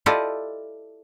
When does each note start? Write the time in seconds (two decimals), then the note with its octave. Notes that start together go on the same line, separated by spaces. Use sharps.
0.06 E4 F4 G4 A4 D5 D#5